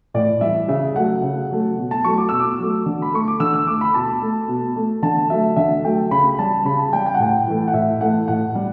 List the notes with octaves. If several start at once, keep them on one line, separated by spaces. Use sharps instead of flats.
A2 D5
E3 G3 E5
C#3 E5
F#3 A3 F#5
C#3
F#3 A3
B2
A5
F#3 A3 C#6
D6
B2 E6
D6
F#3 A3
D3
B5
A3 C#6
D6
D3 E6
E6
A3 D6
B5
B2 A5
A3
B2
A3
D3 A5
F#3 A3 E5
D3 E5
F#3 A3 G5
C#3 B5
G3 A5
C#3 B5
A5
G3 G5
G5
F#5
A2 G5
E3 A3
F#5
A2 E5
E3 A3 F#5
A2 F#5
G3